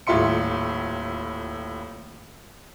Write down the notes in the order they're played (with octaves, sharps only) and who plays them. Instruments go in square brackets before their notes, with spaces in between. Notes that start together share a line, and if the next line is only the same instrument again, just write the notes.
[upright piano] D#1 A2 F4 E5 C6 C#7